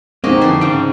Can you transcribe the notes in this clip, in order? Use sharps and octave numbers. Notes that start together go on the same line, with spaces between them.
G#3 A#3 C4 D#4 F#4 G4 D#5
F2 D3 E3 D4 G#4 C5
G#2 C#3 G5